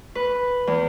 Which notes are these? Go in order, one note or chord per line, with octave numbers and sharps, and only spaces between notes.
B4
E2